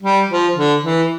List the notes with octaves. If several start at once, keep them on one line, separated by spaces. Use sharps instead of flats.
G3
F3
D3
E3